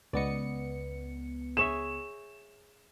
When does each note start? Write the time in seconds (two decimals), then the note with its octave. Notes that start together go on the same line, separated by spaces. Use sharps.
0.13 C#2 B3 D5 D#5 C#7
1.57 G#4 C#5 E5 E7